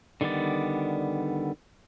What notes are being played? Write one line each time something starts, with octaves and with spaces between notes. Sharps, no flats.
D3 D#3 G3 B3 D5